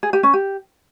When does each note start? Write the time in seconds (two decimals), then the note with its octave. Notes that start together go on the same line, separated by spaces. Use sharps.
0.03 G#4
0.13 G4
0.23 C#4
0.33 G4